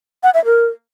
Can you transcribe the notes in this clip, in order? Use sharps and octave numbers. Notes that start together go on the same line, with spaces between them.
F#5
E5
A#4